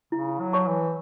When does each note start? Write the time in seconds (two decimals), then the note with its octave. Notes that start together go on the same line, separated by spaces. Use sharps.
0.12 C#3 E4
0.40 F#3
0.53 C#5 A5 C#6
0.67 E3